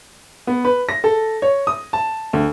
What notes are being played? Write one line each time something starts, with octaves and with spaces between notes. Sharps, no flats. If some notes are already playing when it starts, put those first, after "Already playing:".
B3
B4
A#6
A4
C#5
D#6
A5
D2